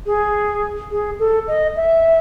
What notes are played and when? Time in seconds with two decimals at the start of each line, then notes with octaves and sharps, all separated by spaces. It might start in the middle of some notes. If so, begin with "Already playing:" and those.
0.06 G#4
0.91 G#4
1.19 A4
1.48 D#5
1.76 E5